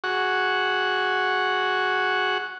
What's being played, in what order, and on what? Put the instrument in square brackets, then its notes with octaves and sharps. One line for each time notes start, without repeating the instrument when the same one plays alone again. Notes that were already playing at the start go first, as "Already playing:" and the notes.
[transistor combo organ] F#4 G#4 F#5 C#6